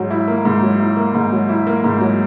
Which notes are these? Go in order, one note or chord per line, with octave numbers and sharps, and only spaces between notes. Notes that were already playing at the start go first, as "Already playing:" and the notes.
Already playing: G#2 F#3
E4
A#3
G#2
F#3
E4
A#3
G#2
F#3
E4
A#3
G#2
F#3